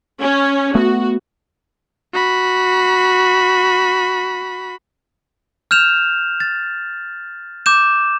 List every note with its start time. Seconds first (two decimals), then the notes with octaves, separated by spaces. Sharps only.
0.20 C#4
0.75 A3 B3 F#4
2.13 F#4 B5
5.71 F6 G6 E7 F7
6.40 A6
7.66 D6 G6 E7